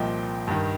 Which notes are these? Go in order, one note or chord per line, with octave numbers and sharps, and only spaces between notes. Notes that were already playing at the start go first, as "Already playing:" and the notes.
Already playing: C2 A#2 F3 D#5 G5
G2 D#3